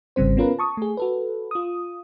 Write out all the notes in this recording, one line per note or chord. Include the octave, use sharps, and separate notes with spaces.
G#1 C#3 G3 C4 C5
B3 C#4 F4 A#4 B4
A5 C#6 D#6
A3 G#4
F#4 A4 B4
F4 D#6